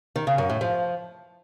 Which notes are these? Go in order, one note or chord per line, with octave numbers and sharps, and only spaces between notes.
D#3
C#3
F#2
A2
F3